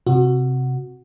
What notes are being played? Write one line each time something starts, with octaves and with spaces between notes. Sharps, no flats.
C3 F#4